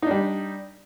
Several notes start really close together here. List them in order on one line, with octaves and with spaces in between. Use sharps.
D#4 D4 G3